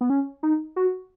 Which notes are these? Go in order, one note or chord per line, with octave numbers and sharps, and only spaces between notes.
B3
C#4
D#4
F#4